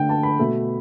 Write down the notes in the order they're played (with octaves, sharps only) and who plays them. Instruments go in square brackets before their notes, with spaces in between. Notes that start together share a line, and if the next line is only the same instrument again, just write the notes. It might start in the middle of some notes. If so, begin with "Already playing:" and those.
Already playing: [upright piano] D3 A3 G5
A5
B5
B2 A3